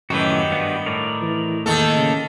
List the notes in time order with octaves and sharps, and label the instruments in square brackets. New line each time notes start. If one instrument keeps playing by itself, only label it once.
[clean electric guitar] F#2 A2 E3 [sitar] D#3 [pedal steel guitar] F#4 G4 B4
[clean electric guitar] G2 B3
[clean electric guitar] A2 [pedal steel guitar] A#4 D5
[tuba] E3
[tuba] E2 [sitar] D#3 A4 [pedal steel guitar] A#3
[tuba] C#3